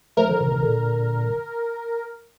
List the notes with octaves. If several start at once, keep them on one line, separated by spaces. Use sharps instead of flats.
F3 A3 A#4
D3 F3
C3 D#3
C3 D#3
A#2 D3